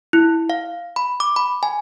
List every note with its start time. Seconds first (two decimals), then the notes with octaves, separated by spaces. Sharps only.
0.13 E4
0.50 F5
0.96 B5
1.20 D6
1.36 B5
1.63 G#5